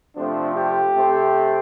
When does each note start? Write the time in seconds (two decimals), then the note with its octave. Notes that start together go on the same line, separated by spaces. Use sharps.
0.15 C3 F3 A3 C4 D4
0.55 G4
0.96 C3 A3 C4